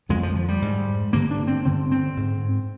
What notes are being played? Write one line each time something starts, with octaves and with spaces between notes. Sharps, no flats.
F2 D3 G#3
F3
F3
G3
G#2
G2 D3 A#3
D4
C4
G2 D3 C4
C4
G#2